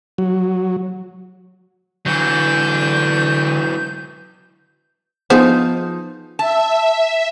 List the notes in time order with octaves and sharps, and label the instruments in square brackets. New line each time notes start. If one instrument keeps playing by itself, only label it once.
[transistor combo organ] F#3
[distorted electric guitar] D3 [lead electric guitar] E3 F#3 [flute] G6
[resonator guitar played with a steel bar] F3 D#4 [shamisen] B3 G#4 C5
[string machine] E5 [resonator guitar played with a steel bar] A5